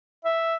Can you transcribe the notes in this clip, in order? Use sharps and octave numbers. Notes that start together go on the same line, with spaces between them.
E5